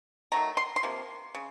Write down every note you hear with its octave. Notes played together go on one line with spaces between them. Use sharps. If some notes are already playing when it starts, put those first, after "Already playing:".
D#3 F#3 A3 A#5
C6
C6
C3 F3 A#3
C#3